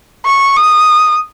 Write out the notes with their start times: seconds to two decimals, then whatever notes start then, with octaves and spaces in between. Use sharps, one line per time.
0.25 C#6
0.57 D#6